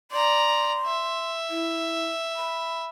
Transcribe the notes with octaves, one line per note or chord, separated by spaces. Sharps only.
D5 A#5 C6
E5
E4
B5